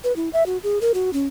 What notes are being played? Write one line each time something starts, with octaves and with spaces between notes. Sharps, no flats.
B4
E4
E5
F#4
G#4
A#4
F#4
C#4